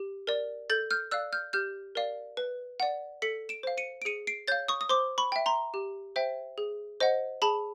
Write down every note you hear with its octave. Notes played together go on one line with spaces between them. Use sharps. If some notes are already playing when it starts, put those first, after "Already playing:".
Already playing: G4
A#4 D5
A4 G6 A6
F6 G6
D5 F5 E6 F#6
F6 G6
G4 F6 G6
A#4 D5 F5
B4
D5 F#5
A4 B6 C#7
D7 E7
C5 F5
C#7 D#7
D7
G#4 C#7 D#7
C7 D7
C#5 F5 G6 A6
C#6 D#6
D#6
C5 C6 D6
B5 C#6
E5 G5
A#5 C6
G4
C5 E5 G5
G#4
C5 D#5 F#5
G#4 A5 B5